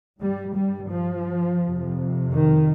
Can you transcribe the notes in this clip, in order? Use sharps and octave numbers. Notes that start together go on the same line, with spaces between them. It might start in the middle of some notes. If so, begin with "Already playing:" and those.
G2 G3
G3
F3
F2 C3
D#3